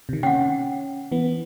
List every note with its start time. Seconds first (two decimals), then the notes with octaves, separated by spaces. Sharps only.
0.09 C3 D#3
0.23 C#4 F#5 G5
1.12 E3 B3